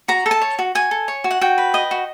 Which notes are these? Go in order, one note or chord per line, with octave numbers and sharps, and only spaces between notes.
F#4 A#5
A4
A5
C#5
F#4
F#4 G#5
A4
C#5
F#4
F#5
F#4 G5
B4
D#5
F#4